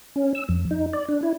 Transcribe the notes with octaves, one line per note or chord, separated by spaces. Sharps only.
C#4
E6
F2
D#4
D5
D4
E4